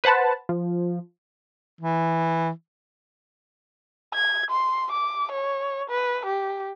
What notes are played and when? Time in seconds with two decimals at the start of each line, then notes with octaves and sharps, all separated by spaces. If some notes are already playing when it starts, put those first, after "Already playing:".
0.04 B4 C5 F#5 A5 B5
0.49 F3
1.81 E3
4.14 G#6
4.50 C6
4.91 D6
5.32 C#5
5.90 B4
6.25 G4